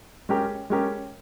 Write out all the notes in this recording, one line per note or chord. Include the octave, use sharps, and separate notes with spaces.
G#3 C#4 G4 A#4
G#3 C#4 G4 A#4